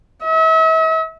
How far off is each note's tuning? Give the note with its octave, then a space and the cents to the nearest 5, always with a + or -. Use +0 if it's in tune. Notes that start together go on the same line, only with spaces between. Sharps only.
E5 -40